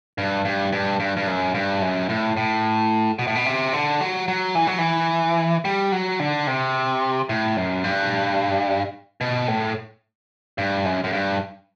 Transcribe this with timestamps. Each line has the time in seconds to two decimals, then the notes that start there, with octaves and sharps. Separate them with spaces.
0.18 G2
0.45 G2
0.73 G2
1.00 G2
1.17 G2
1.27 F#2
1.54 G2
1.82 F#2
2.09 A2
2.37 A2
3.19 B2
3.27 A2
3.35 B2
3.46 C3
3.73 D3
4.01 F#3
4.28 F#3
4.55 E3
4.67 F#3
4.78 E3
5.65 G3
5.92 F#3
6.20 D3
6.47 C3
7.29 A2
7.57 F#2
7.84 G2
9.21 B2
9.48 A2
10.58 G2
10.85 F#2
11.04 F#2
11.13 G2